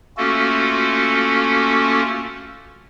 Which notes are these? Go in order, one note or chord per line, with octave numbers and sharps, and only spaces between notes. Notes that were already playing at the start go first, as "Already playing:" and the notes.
A3 A#3 C#4 F4 F#4 A4